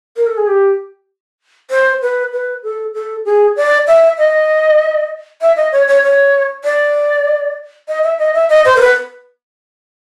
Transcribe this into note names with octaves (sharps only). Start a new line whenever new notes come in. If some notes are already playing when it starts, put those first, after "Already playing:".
A#4
A4
G#4
G4
C5
B4
B4
A4
A4
G#4
D5
E5
D#5
E5
D#5
C#5
C#5
C#5
D5
D#5
E5
D#5
E5
D#5
C5
A#4
B4